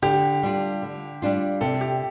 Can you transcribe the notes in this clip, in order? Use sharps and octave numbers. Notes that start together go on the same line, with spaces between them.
D3 G4
G3 D4 F4
D3
G3 D4 F4
C3 A4
G4